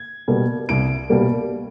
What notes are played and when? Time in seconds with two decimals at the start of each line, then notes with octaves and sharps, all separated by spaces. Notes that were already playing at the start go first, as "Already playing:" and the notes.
Already playing: G#6
0.28 B2 G3 A#3
0.69 C2 D7
1.10 B2 G3 A#3